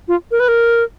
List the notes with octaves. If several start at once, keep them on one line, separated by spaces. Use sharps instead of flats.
F4
A#4
B4
A#4